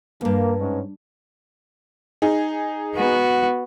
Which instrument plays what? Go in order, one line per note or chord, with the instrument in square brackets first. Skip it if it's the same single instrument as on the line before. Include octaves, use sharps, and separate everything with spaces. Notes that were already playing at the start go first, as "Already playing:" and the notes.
[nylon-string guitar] E2 G2 [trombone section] A#3
[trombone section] G#2 G#3 C#4
[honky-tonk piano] D#4 G#4
[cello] B3 F#4